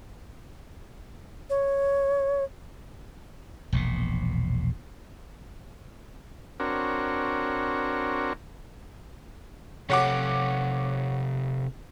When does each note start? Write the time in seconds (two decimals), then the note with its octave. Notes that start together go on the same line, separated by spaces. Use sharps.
1.50 C#5
3.73 E1 A#1 B2
6.60 C4 D4 F#4 A#4 C#5
9.90 C3 A4 C#5 F#5 D6